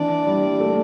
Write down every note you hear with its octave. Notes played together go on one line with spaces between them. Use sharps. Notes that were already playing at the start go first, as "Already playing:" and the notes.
Already playing: E3 D4 D5
G3
A3